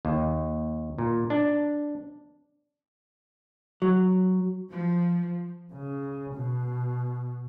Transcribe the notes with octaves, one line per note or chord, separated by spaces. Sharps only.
D#2
A#2
D4
F#3
F3
C#3
B2